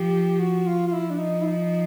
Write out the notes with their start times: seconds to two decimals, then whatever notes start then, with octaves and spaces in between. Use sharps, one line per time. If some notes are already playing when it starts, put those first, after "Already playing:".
Already playing: F3 G4
0.40 F#4
0.66 F4
0.87 F4
0.92 F3 E4
1.10 D4
1.19 D#4
1.41 E4
1.45 D#4